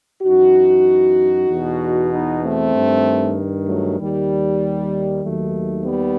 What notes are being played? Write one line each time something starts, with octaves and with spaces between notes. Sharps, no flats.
F#2 E3 D#4 F#4
E2 B2
B3 D#4
A3 C4
G2 D#3
F#3 A3
D#2 D#3 G3
D#2 D#3 F#3 A3
G3 B3